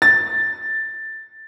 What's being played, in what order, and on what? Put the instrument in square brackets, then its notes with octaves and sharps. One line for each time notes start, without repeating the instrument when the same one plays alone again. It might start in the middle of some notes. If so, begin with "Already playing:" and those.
[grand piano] A6